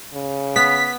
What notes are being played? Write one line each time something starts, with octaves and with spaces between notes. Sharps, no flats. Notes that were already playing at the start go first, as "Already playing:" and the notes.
C#3
B3 B6